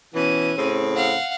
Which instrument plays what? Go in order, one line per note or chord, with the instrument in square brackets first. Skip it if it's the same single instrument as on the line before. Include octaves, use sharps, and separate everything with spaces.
[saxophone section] B2 E3 [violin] C#4 D#7
[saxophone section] A2 C#3 C4
[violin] F5 F#5